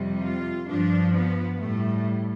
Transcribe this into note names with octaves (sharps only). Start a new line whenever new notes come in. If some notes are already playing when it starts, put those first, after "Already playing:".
Already playing: F2 C3 G3
F4
G2 F3 D4
B3
A2 G3 A3